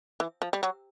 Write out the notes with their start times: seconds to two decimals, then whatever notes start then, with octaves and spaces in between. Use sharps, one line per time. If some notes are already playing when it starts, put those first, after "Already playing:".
0.20 E3
0.42 F3
0.53 G3
0.63 F#3